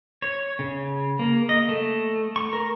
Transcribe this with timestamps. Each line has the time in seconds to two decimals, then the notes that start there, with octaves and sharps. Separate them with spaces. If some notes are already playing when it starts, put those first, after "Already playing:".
0.22 C#5
0.59 C#3
1.19 A#3
1.49 D#5
1.69 A3
2.36 C#6
2.53 A#4